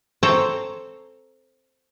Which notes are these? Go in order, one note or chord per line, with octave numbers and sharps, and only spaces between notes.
C4 A4 C5 C#5 A5 A#5